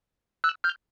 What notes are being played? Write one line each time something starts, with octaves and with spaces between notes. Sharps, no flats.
E6 F#6
F6 G6